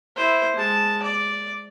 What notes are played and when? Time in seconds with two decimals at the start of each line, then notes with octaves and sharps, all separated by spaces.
0.16 E4 C5
0.56 G#3 A5
1.03 D5